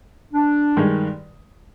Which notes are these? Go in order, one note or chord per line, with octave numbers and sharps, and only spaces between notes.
D4
G2 D#3 G#3